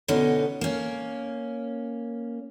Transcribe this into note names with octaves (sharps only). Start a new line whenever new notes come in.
B2 D3 C#4 D#4
A#3 C#4